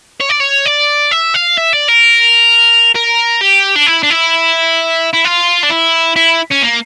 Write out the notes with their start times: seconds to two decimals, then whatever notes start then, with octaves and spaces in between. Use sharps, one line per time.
0.20 C#5
0.29 D5
0.40 C#5
0.65 D5
1.11 E5
1.34 F5
1.57 E5
1.73 D5
1.88 A#4
2.95 A#4
3.41 G4
3.76 D4
3.87 E4
4.03 D4
4.10 E4
5.13 E4
5.24 F4
5.63 D4
5.70 E4
6.16 E4
6.51 C#4
6.62 A#3